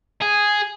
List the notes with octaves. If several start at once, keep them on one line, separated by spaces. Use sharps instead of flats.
G#4